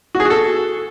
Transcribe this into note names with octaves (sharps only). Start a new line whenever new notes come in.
F#4
G#4
F#4
A4